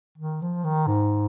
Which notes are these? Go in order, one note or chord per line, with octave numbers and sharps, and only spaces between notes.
D#3
F3
D#3
G#2